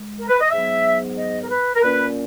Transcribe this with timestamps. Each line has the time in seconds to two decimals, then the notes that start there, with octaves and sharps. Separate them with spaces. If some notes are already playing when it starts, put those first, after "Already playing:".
Already playing: G#3
0.18 A#4
0.29 B4
0.40 D#5
0.51 G#2 F#3 B3 E5
1.17 D#5
1.42 A#4
1.49 B4
1.75 A#4
1.83 A#2 A#3 C#4 B4